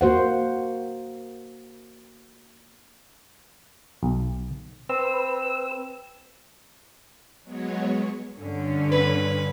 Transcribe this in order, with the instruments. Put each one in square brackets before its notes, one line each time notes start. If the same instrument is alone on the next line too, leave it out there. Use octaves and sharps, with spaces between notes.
[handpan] A#3 F#4 C5 F#5
[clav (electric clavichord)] B1
[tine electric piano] C4 [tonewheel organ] B4 E6
[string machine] F#3 G#3 B3 C#5
[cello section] G2 D3 C#4
[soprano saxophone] B4